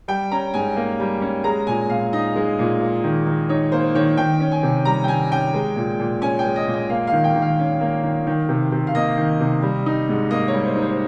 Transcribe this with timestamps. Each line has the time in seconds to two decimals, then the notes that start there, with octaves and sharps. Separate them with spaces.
0.08 G3 G5
0.31 C#4 A#5
0.54 G#2 G#5
0.76 A#3
1.00 G3
1.22 C#4
1.44 G#3 A#5
1.67 A#2 G#5
1.90 A#2 F5
2.13 D#4 D#5
2.36 G#3
2.59 A#2
2.81 A#3
3.04 D#3
3.27 D#3
3.49 D#4 C#5
3.72 A#3 C5
3.95 D#3 C#5
4.17 D#3 G5
4.40 C#4
4.52 G#5
4.63 C3
4.85 G3 A#5
5.04 G5
5.08 D#3 G#5
5.32 C#4 G5
5.54 G#3
5.76 A#2
6.00 A#2
6.22 C#4 G#5
6.39 G5
6.45 G#3
6.56 D#5
6.67 A#2
6.74 D#5
6.90 A#3 F5
7.07 F5
7.12 D#3
7.24 G5
7.35 D#3
7.42 F5
7.59 C#4
7.81 A#3
8.03 D#3
8.27 D#3
8.49 C3
8.72 C3
8.87 F5
8.95 A#3 D#5
9.18 D#3
9.40 C3
9.62 G3
9.86 D#4
10.09 G#2
10.31 A#3 D#5
10.48 C#5
10.53 G3
10.66 C5
10.76 D#4
10.82 C5